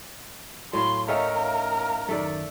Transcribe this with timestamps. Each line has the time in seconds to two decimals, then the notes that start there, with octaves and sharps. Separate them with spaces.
0.73 A2 F#3 F5 C6
1.08 A3 C#4 D#4 A#4 E5 F5 G5
2.09 F#2 D#3 A3 A4 D5